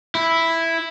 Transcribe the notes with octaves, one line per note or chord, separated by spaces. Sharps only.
E4